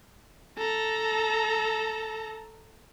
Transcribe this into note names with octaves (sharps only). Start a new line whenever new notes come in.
A4 A#5